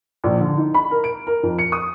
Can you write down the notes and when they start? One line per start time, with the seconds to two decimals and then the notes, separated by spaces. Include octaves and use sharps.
0.24 A#1
0.40 D3
0.58 D#4
0.74 B5
0.91 A#4
1.04 D7
1.27 A#4
1.43 F2
1.59 C#7
1.72 D#6